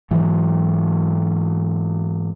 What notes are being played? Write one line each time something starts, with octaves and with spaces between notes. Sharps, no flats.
G#2 E3 F#3